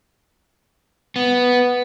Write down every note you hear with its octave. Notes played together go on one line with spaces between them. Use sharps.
B3